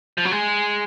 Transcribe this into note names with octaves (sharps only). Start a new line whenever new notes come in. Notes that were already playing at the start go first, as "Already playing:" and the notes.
F3
F#3
G#3